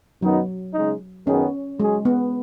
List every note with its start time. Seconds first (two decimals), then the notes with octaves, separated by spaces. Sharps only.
0.22 F#2 D#3 F#3 B3 D#4
0.74 C#3 G#3 D#4
1.26 F#2 D#3 B3 C#4 G#4
1.80 F#3 G#3 C#4 G#4
2.05 B3